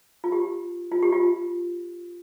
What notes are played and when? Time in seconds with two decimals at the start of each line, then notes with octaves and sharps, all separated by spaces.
0.24 F4
0.32 G4
0.92 F4
1.02 G4
1.13 F4